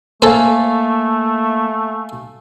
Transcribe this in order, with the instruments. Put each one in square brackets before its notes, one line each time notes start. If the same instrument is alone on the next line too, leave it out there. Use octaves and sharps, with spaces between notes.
[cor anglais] A3 [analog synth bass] A#3 [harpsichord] A4 C5 [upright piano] F5 G#5